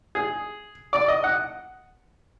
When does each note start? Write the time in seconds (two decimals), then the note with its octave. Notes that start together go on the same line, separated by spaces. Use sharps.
0.15 G#4
0.93 D5
1.08 D#5
1.24 F#5